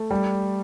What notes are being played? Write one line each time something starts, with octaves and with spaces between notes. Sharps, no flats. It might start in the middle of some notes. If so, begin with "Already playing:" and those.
Already playing: A3
G3